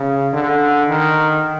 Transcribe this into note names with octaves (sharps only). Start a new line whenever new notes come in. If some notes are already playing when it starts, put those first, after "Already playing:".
Already playing: C#3
D3
D#3